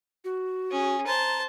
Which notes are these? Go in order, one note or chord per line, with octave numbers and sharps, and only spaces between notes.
F#4
C#4 G#4
C5 A5 A#5